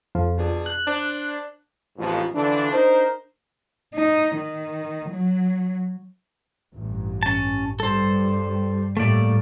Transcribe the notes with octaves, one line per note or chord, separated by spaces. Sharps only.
F2 F3
B2 D4 G#4
F#6
D4 C5
A1 F2 G#2 B2 F3
D3 E3 F3 D4
D4 D#4 A#4 C5
D#4
D#3
F#3
A1 G2
C#4 A5
G2 G3 A4 C5
A2 G3 A3 A#3 D5